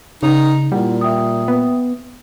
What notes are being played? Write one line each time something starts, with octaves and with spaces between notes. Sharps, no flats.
C#3 D#4
A#2 G3 E4 F#5
E5 G5 D#6
B3